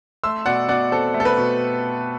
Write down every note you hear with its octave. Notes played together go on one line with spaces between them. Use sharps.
A3 C6 E6
B2 D5 F#5
B2 D5 F#5
C4 A4
A3
A4
B4
B2